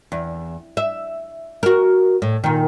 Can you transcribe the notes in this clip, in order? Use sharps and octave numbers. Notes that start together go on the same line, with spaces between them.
E2
E5
F#4 A#4
A2
A#2 D#3